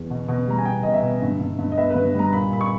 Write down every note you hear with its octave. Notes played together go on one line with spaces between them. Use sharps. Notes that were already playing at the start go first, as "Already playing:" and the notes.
Already playing: E2
B2
B2
G3 A#5
G#5
B2 G5
B2 D#5
E5
B2
G2
G2
G2
D#5
B3 E5
B4
G2
G3 A#5
A#2 B5
A#2 B5
C#6